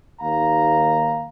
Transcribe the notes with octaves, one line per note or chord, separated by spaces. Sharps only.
D#2 F5 A#5